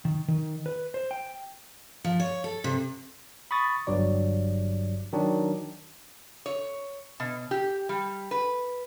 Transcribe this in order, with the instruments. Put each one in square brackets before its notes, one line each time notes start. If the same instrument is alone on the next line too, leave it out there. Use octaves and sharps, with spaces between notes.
[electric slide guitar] D#3
D#3
B4
C5
G5
[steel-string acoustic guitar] F3
C#5
A4
C3
[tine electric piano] B5 C#6 D#6 A6
G1 G2 F#3 D5
D#3 F#3 D4
[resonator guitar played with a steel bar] C#5
B2
G4
G3
B4